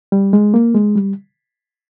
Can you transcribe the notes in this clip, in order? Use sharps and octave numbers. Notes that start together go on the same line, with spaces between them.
G3
G#3
A#3
G#3
G3